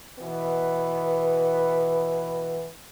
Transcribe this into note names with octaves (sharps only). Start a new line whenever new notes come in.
B2 E3 B3 B4